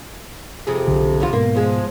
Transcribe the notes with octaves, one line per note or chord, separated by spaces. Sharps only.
F2 C3 G#4
B1 D3
E2 C3 F4
G#2 B2 A#3
F3 G#3